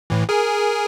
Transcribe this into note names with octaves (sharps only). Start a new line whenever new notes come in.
A2 E3
G#4 A#4 G#5